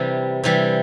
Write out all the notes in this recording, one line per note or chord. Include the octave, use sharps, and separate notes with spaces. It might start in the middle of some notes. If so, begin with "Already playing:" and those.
Already playing: C3 E3 G3
C3 E3 G3